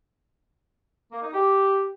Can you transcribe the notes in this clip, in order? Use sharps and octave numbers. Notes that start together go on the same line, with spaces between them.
A#3
D#4
G4